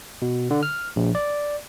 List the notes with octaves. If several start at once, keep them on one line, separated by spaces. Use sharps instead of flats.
B2
D3
F6
A#1
D5